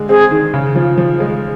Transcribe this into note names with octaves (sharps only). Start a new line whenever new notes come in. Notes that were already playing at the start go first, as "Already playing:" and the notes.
Already playing: D3 G#3
C4 G#4
D#3
C#3
F3
F3
G#3